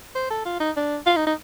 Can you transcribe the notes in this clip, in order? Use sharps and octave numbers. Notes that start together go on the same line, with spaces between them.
C5
A4
F4
D#4
D4
F4
D#4
D#4